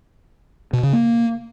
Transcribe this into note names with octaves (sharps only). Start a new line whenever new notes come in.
B2
C#3
A#3